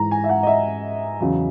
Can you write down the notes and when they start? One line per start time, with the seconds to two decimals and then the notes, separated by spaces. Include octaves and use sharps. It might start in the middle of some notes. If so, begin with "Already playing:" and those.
Already playing: G#2 E3 A#5
0.11 G#5
0.24 E5
0.29 F#5
0.43 D#5
0.47 E5
1.20 E2 C#3 F#3